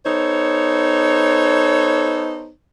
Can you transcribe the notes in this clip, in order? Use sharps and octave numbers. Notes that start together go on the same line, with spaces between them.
B3 D#4 A4 C5 C#5